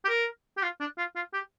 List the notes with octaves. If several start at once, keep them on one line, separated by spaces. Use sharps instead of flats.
G4
A#4
G4
F4
D4
F4
F4
G4